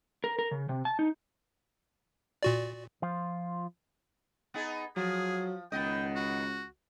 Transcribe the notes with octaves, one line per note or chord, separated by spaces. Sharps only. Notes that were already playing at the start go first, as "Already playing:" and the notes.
A#4
A#4
C#3
C3
A5
D#4
A#2 F#4 D5
F3 F4 C5
B3 D#4 G#4
F3 F#3 G#4
C#2 D#3 B3 D#5 G5
F#4